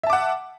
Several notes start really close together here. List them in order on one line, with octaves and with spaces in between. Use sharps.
E5 A5 D6 F#5